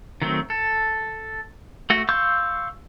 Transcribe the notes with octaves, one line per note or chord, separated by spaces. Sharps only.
D#3 F#3 A3 C4
A4
A3 F#4
F5 C6 C#6 E6 G6